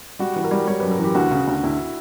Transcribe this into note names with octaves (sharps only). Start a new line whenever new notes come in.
G3 F#4
E3
A#4
G3
G3 C#5
F#2 B4
A#4
E3 G4
D2 F#4
C#3
D2
D2 E4